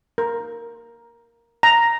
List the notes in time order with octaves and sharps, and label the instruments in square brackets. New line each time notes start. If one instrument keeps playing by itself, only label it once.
[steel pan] A#4
A#5